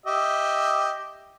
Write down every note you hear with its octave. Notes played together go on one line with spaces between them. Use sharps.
G4 D#5 E5